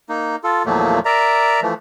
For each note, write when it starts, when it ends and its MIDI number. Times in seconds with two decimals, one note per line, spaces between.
0.09 0.36 58
0.09 0.36 63
0.44 0.63 65
0.44 0.63 69
0.66 0.99 40
0.66 0.99 46
0.66 0.99 53
0.66 0.99 54
0.66 0.99 57
0.66 0.99 58
1.05 1.60 70
1.05 1.60 74
1.05 1.60 76
1.05 1.60 82
1.62 1.74 52
1.62 1.74 53
1.62 1.74 57